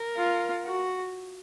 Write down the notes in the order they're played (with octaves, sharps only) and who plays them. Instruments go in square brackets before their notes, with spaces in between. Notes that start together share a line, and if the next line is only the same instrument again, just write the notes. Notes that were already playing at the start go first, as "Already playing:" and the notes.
Already playing: [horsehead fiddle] A#4
[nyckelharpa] F4
F#4